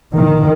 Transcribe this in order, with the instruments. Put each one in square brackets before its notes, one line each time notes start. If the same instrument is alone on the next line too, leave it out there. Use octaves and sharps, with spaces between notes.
[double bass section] D#3